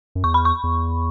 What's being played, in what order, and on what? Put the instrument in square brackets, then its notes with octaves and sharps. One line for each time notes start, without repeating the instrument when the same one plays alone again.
[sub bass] F#2
[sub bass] E2 [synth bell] C#6
[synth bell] B5
C#6
[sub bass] E2